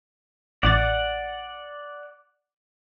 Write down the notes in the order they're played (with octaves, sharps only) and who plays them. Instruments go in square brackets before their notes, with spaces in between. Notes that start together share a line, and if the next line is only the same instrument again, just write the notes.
[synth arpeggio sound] A1 D6 A6 [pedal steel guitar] D5 F#5